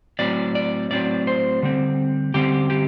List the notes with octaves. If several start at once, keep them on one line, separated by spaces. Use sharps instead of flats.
A2 F#3 C4 D5
D5
A2 F#3 C4 D5
C5
D3 G3 C4
D3 G3 C4 G4
G4